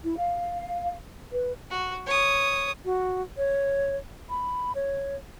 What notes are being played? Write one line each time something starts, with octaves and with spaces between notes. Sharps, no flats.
E4
F5
B4
F#4
C#5 D#6
F#4
C#5
B5
C#5